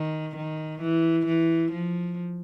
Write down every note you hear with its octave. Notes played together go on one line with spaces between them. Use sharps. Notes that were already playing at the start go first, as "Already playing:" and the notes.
Already playing: D#3
D#3
E3
E3
F3